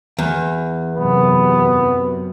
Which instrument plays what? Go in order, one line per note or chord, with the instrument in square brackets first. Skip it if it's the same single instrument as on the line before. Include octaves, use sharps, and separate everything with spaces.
[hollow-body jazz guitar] E2
[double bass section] F#2 C3 [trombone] B3